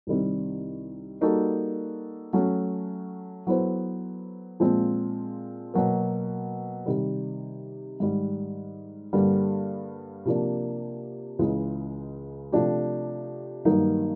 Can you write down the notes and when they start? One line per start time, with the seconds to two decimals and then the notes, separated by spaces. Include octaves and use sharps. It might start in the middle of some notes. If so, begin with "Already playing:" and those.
0.07 C2 C3 D#3 G3 C4
1.21 G3 A#3 D#4 F#4 A4
2.33 F#3 A3 C#4 F#4
3.47 F#3 B3 E4 A4 C5
4.60 A#2 F3 G#3 C4
5.74 B2 F#3 A#3
6.86 C3 D#3 G3
8.00 G#2 D#3 G3
9.13 G2 D3 G3 A#3
10.25 C3 F3 A#3 D4
11.39 C#2 C#3 E3 G#3
12.52 C3 F3 A3 D4 G4
13.65 G2 D#3 F#3 A#3 D#4